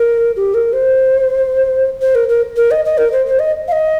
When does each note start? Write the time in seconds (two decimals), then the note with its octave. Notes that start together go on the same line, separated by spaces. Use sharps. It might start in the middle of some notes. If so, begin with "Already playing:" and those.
Already playing: A#4
0.36 G4
0.54 A#4
0.73 C5
2.01 C5
2.15 A#4
2.29 A#4
2.56 A#4
2.71 D#5
2.85 D#5
2.98 A#4
3.12 C5
3.26 C5
3.39 D#5
3.68 F5
3.72 D#5